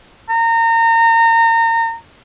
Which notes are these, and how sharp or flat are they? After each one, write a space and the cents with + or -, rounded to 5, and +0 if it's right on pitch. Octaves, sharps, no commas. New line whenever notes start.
A#5 -30